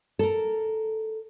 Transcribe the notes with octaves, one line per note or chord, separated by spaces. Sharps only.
A4 A#4